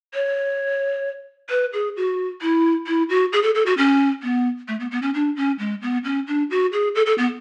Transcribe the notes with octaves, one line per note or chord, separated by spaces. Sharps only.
C#5
B4
G#4
F#4
E4
E4
F#4
G#4
A4
A4
F#4
C#4
B3
A3
B3
B3
C#4
D4
C#4
G#3
B3
C#4
D4
F#4
G#4
A4
A4
B3